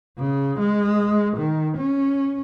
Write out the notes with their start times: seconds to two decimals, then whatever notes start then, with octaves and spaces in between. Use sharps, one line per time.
0.18 C#3
0.59 G#3
1.37 D#3
1.78 C#4